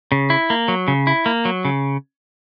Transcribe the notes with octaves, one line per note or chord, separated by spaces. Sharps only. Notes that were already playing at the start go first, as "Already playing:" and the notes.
C#3
E4
A#3
F#3
C#3
E4
A#3
F#3
C#3